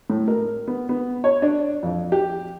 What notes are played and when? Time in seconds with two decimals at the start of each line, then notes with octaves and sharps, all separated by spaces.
0.10 A2
0.28 A#4
0.68 B3
0.89 B3
1.24 C#5
1.42 D4
1.83 F2
2.12 G4